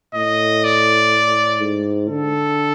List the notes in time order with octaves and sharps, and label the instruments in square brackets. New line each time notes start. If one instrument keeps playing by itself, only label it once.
[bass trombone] A2 [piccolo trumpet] D#5
[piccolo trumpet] D5
[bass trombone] G#2
[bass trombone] D3 [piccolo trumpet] A4